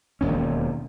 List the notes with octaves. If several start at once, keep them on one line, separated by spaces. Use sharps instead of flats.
E1 D#2 C#4